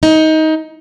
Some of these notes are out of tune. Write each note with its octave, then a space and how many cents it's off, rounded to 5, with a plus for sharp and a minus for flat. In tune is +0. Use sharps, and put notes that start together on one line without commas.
D#4 +20